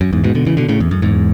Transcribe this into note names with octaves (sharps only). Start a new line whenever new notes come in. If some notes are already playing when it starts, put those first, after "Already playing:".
F#2
E2 G#2
G#2 B2
B2 D3
C#3 E3
B2 D3
A2 C#3
E2
F#2
E2 G#2